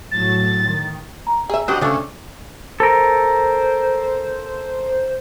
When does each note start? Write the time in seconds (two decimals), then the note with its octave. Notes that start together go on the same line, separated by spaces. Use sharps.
0.11 A2 F#3 A6
0.68 D#3
1.27 A#5
1.49 G#4 E5
1.68 D4 F#4 G4 C5 D#5 F#5
1.81 C#3 A3 D4 D5
2.80 A4 A#4 C5